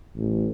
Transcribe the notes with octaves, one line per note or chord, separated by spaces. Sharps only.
A1